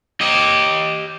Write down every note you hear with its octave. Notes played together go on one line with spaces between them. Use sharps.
G4 D#5